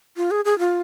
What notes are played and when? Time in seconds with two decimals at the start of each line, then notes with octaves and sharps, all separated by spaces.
0.17 F4
0.31 G#4
0.45 G#4
0.59 F4